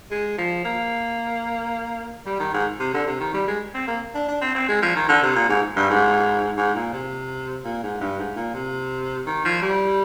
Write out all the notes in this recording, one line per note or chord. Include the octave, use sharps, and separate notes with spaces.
G#3
F3
A#3
G3
D#3
G#2
C3
D3
C3
D#3
G3
G#3
C4
A#3
D4
D4
C4
C4
G#3
F3
D#3
D3
C3
A#2
G#2
G2
G#2
G#2
A#2
C3
A#2
G#2
G2
G#2
A#2
C3
D#3
F3
G3